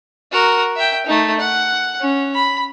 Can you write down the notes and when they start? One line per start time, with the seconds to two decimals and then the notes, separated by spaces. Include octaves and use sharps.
0.32 F#4 A#4
0.76 E5 G5
1.06 A3 D#4
1.40 F#5
2.00 C#4
2.35 B5